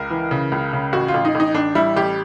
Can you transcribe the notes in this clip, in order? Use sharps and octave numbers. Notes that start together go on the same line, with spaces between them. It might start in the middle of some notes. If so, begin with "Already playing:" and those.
Already playing: C#2 A#4
E3
C#3
C#2
C#3
A1 F#4
F4
A1
D#4
A1 D#4
A1 D4
G3 E4
A1 G4